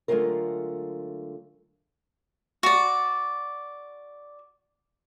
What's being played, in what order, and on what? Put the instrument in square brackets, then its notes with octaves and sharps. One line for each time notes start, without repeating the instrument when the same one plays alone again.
[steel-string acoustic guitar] D3 F#3 G#3 A3 F4 A#4
[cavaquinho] F#4 D5